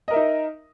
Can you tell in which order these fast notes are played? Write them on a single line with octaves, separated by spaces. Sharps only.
D#5 A#4 E5 D#4